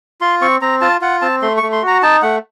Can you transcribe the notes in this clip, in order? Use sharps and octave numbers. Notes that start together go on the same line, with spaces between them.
F4 C6
C4 C#6
C4 A#5
F4 A5
F4 F#5
C4 A5
A3 C6
C#6
A3
C6
F#4 A#5
D#4 A5
A3 F#5